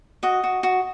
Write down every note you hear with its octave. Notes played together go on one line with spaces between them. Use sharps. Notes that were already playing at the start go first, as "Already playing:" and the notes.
F#4 D#5
F#4
F#4